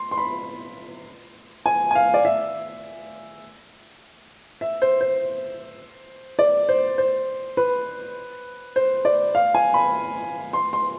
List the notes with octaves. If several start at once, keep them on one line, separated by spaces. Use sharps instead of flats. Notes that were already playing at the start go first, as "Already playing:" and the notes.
Already playing: C6
C6
B5
G#5
G#5
F5
D5
E5
E5
C5
C5
D5
C5
C5
B4
C5
D5
F5
G#5
B5
C6
C6